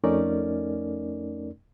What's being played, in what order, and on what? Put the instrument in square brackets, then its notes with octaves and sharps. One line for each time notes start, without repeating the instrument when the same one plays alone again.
[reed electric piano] F2 A3 C#4 D#4 A#4 D5